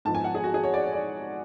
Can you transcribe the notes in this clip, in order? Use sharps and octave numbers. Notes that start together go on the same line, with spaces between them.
G#2 F3 B3 A5
G#5
F#5
G#4
F#4
G#4
C#5
D5
C#5
D5